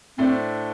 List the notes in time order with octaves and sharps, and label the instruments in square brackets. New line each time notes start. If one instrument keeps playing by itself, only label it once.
[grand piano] A2 A3 D4 C5 [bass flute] C4